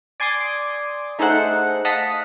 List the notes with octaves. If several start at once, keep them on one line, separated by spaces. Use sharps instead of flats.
D5 G#5 C6 D6 D#6
A3 D#4 G#4 A4 C5 F#5
D#5 F5 F#5 A5 D#6 B6